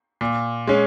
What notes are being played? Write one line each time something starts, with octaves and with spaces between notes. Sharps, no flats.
A#2
G#3 C#4